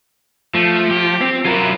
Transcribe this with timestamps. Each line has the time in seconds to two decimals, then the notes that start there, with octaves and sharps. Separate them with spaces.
0.55 F3 A3
0.91 G4
1.21 C4
1.45 F#3 E4 F4 A#4